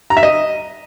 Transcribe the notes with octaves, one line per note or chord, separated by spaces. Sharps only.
A#5
E5
D#5